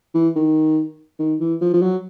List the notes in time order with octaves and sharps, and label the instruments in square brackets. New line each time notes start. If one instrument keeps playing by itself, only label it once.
[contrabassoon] E3
D#3
D#3
E3
F3
F3
F#3